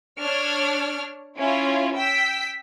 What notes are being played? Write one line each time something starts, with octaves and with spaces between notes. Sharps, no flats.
D4 C#5 F6
C#4 E4 F4
G5 E6 B6